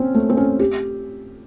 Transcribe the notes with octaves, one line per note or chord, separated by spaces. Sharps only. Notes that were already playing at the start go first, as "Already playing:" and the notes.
Already playing: C4 C#4
A3
C4
C#4
G4